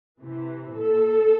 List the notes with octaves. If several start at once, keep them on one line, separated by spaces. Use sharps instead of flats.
C3 E3
A#2 A4